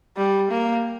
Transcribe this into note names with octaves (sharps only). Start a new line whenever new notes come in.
G3
A#3